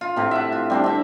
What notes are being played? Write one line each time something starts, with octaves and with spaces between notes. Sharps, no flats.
F4
A2 C3
E5 F#5
F4
G3 C4 D4
C4 E5